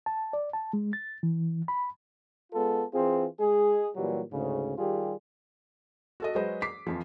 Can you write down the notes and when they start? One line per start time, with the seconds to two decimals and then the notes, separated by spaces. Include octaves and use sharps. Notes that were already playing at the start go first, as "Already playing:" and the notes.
0.06 A5
0.33 D5
0.53 A5
0.73 G#3
0.93 A6
1.23 E3
1.68 B5
2.53 G#3 B3 F4 A4
2.92 E3 C4 F4 G#4
3.39 G#3 G#4
3.96 A#2 E3 F#3 G3
4.31 D2 G#2 C#3
4.77 D#3 G3 F4 G4 G#4
6.20 F#4 A4 D#5
6.35 F#3 G#3 F#4 B4 C5 D#5
6.62 D6 B6 C7
6.87 F2 E3 F3